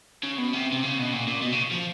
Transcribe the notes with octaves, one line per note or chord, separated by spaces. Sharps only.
C#3
B2
C3
C3
C#3
B2
A#2
A#2
B2
C#3
F3